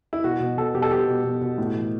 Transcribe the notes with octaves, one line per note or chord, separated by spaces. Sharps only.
E4
B2 F#4
B2
B2 A4
B2 G4
A4
B2 G4
B2
B2
B2
A2
E3